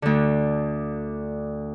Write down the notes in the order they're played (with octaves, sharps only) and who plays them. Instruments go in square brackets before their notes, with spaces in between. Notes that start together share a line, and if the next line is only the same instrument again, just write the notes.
[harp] D2 D3